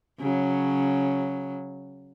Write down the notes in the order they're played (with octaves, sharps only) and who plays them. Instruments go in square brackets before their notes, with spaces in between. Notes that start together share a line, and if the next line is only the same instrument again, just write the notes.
[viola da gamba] C#3 F#3